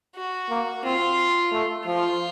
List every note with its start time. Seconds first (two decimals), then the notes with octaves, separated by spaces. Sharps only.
0.16 F#4
0.50 A#3
0.84 C4 F4
1.52 A3
1.85 F3 F4